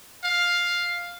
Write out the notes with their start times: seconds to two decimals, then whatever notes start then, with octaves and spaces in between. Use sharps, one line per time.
0.24 F5